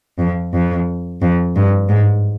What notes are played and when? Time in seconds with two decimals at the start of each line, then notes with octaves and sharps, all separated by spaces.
0.19 F2
0.53 F2
1.22 F2
1.56 G2
1.89 G#2